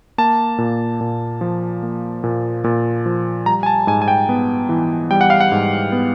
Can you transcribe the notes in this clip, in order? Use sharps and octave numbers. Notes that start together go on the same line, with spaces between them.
A#3 A5
A#2
A#2
F3
A#3
A#2
A#2
F3
G3 A#5
G#5
A5
G#2 G#5
G#5
G5
B3
E3
G3 G5
F#5
F5
F#5
G#2
B3